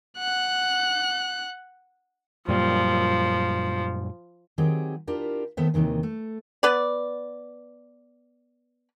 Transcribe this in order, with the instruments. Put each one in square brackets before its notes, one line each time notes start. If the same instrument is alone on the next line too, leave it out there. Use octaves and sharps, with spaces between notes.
[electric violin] F#5 F#6
[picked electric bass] F#2 A#2 G3 [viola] F3
[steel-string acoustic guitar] D#3 F#3 C4 G4 G#4
D4 E4 F4 G4 A#4
D#3 A3 B3 C5 E5
D#2 G#2 C3 D#3 E3
A3
[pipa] B3 B4 D5